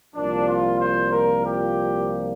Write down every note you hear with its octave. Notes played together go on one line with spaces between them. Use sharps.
C2 A#2 F3 D4
F4
C5
A#4
G4